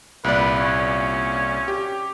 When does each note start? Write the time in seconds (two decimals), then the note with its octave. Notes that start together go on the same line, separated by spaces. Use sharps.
0.24 C2 A#2 B4 D5
0.59 C#4
1.68 G4